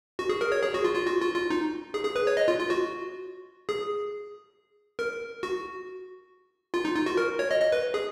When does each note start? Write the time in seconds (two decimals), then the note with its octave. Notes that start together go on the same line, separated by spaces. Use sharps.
0.19 F#4
0.29 G#4
0.41 A#4
0.52 C#5
0.63 G#4
0.74 F#4
0.84 F4
0.95 F4
1.07 F#4
1.21 F4
1.35 F4
1.50 D#4
1.94 G#4
2.04 G#4
2.16 B4
2.27 C#5
2.37 D#5
2.48 F4
2.59 F4
2.70 F#4
3.69 G#4
4.99 A#4
5.43 F#4
6.74 F4
6.85 D#4
6.96 F4
7.06 F#4
7.17 A#4
7.39 C#5
7.51 D#5
7.61 D#5
7.72 B4
7.94 G#4